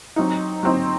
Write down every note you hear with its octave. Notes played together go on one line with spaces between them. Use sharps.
F#3 C4 D#4
F#3 C4 D#4